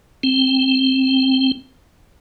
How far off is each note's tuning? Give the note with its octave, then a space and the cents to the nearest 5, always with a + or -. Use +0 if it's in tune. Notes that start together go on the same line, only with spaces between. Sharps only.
C4 +10